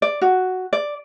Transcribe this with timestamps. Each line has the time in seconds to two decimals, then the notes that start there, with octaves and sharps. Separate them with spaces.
0.02 D5
0.21 F#4
0.73 D5